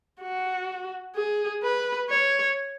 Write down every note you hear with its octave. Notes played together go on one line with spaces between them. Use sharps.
F#4
G#4
B4
C#5